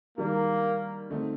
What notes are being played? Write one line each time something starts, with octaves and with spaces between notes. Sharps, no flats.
D#3 G3 A#3 D4
D3 A3 C4 D#4